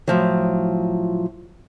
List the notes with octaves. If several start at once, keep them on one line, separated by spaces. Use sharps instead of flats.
A2 F3 F#3